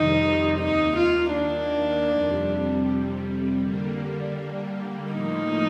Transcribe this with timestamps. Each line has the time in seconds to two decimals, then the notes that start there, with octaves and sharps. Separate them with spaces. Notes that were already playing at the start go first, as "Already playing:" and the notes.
Already playing: F2 C3 D#3 G3 C4 D#4
0.59 D#2 D#3 A#3 D#4
0.97 F4
1.34 D4
2.10 F2 C3 G3
3.60 D3 G3 A#3
5.11 A2 F3 A#3 D#4